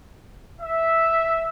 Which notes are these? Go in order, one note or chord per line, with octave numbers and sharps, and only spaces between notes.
E5